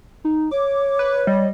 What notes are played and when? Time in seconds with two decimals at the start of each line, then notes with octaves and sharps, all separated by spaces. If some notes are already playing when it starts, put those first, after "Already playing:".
0.25 D#4
0.51 C#5 D6
0.99 B4
1.27 G3 D#5